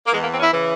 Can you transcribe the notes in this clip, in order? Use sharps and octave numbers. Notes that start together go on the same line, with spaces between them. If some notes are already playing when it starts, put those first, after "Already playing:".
A#3
E2 E3 G#3
A#3
C4
C#4
E4
C#3 E3